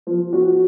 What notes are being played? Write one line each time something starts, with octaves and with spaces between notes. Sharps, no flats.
F3
F#4